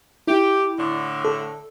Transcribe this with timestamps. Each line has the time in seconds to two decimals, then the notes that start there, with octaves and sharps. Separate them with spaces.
0.27 E4 G4
0.79 A2 D3
1.25 A4